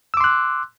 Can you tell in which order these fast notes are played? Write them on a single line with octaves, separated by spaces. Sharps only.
E6 D6 C6 F#6